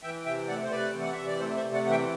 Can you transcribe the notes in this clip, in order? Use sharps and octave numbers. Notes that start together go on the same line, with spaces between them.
E3 E5 G5
C3 E5 G5
A3 D5 F#5
C5
C3 B4 D5
E3
F#5
C3 E5
D5
A3 A4 C5
C5 E5
C3
D5 F#5
E3 F#5
E5 G5